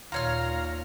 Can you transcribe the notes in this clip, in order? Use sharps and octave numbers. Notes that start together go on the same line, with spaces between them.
D#2 A#2 F4 C#5 F5 A#5 F6